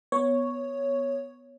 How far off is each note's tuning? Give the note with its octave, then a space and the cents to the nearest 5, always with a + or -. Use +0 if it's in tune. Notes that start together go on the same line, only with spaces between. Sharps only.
B3 +0 C#5 +0